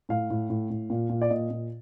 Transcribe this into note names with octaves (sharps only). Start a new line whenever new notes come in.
A2 F5
A2
A2
A2
A#2
A#2
D5
A#2 D#5
A#2